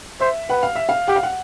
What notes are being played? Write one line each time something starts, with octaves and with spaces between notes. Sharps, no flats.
C5 E5
B4 F#5
F5
E5
F5
G4 F#5
F5
F#5